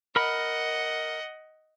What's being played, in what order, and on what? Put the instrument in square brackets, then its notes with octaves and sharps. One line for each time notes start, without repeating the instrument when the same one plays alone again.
[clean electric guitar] A#4 B5 [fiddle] D#5 F#5